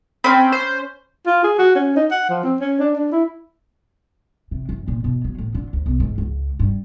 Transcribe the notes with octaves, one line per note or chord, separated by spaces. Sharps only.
C4 C#4 B5
C5
F4
G#4
F#4
C#4
D#4
F#5
F3
C4
C#4
D4
D4
E4
C3
F#2
A#2
B2
F#3
A2
D3
D2
B1
G#2
C#2
G2